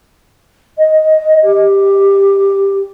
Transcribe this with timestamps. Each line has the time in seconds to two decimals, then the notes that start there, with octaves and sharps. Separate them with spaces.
0.78 D#5
1.42 G4